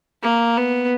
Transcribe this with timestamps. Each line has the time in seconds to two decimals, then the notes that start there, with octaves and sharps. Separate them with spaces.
0.23 A#3
0.57 B3